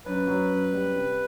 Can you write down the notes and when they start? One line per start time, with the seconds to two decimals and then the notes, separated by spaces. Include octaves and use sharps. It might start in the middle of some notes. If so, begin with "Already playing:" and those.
0.06 F#2 B4
0.27 F#3
0.50 F#2
0.73 G3
0.95 C3